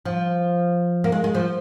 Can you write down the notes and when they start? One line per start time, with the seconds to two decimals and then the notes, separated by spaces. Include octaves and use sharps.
0.05 F3
1.04 A#3
1.12 G#3
1.24 G#3
1.35 F3